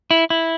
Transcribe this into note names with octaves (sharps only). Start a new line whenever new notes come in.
E4
E4